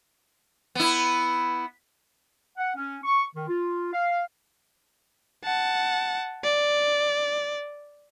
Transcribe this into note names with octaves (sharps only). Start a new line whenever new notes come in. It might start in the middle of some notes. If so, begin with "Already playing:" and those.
B3 E4
F#5
C#4
C#6
D#3
F4
F5
F#5 A5
D5